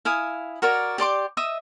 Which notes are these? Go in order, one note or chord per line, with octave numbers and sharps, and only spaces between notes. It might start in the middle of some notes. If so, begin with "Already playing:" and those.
E4 F5 G#5 D#6
F#4 A#4 C#5 D5
G4 D5 C6 D6
D#5 E5 D#6